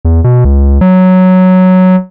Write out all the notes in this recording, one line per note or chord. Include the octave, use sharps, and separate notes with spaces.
E2
B2
C#2
F#3